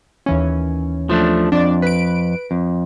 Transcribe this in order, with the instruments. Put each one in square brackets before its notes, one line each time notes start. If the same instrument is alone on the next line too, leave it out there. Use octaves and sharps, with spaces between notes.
[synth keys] D#2 E3 C#4
[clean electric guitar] F3 A3 D4
[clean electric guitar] F2 [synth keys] D4 D5
[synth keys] B4 D7
[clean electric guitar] F2